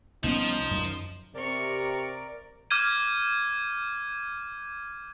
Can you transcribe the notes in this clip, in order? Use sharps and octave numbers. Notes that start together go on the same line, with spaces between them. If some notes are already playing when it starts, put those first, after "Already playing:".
C2 F3 B3 C#4 D#4
F#2
C3 A#4 D5 A#5 C#6
D6 F6 G6 G#6 D#7